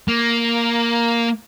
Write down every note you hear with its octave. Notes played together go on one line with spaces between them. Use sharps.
A#3